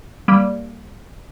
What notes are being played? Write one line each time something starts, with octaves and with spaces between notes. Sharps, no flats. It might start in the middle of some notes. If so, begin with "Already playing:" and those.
G3 A#3